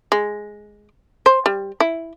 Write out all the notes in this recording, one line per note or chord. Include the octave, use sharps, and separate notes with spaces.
G#3
C5
G3
E4